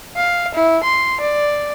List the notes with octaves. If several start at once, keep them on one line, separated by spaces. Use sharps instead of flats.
F5
E4
C6
D5